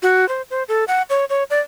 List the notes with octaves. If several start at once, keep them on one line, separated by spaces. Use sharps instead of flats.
F#4
C5
C5
A4
F#5
C#5
C#5
D5